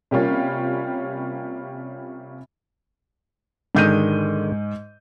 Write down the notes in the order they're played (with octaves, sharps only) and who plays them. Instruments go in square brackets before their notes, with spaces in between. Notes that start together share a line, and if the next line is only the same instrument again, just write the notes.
[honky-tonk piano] C3 G3 A#3 C#4 F4
[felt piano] G#2 G6 D#7 [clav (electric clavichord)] D3 D#3 G#3